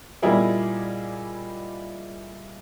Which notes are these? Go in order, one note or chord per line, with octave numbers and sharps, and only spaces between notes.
A#2 G3 D#4 E4 G#4 A#4